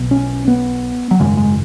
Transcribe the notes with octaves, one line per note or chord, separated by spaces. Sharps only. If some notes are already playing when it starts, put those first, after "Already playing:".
Already playing: B1 B2
C#4
B3
F#3
G#1 F#2 C#3 G#3
G#3